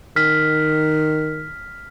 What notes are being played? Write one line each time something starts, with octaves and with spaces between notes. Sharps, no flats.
D#3 F6 B6